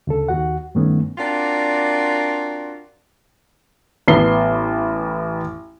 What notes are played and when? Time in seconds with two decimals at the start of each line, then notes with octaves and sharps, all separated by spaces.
0.07 D2 C#3 A4
0.29 D#2 F#4 F#5
0.75 G2 D#3 A3 B3 C#4
1.18 C4 D4 F4 F#4 A#4 D5
4.08 A1 B3 C7 G7